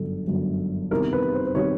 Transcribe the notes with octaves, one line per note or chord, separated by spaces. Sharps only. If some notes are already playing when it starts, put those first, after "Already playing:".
Already playing: G1 F#2 D3 A4
G1 F#2 D3
E2 C3 D#3 G3 A#4
B4
C5
C5
C3 D#3 G3 C#5